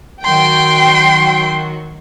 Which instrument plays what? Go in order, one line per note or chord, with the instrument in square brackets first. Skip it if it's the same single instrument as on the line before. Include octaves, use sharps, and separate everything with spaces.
[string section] D#3 F#3 F#4 [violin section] G5 [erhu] C6